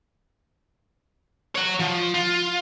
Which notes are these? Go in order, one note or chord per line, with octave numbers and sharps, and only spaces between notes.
C#5 F#5
F3
F4